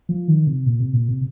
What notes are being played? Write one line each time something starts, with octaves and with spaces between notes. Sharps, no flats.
F3
D#3
C3
A#2
C3
A#2
C3